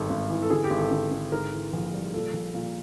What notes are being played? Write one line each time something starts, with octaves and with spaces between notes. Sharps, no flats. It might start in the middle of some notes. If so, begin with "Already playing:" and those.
Already playing: G#1 G2 A4
G#1
E3
A4
D3 G#4
G4
G#1
A4
D3
D3
G#2 A#4
E3
A#1
G3
A#2 A4
A#1
A#2